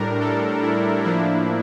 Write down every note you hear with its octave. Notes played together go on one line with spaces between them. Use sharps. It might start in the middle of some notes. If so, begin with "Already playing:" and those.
Already playing: A2 G3 D4 A#4
A4
E4
A2 F3 A#3 D4 E4